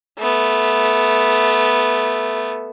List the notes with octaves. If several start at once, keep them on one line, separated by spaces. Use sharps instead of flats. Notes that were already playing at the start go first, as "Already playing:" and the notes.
A3 B3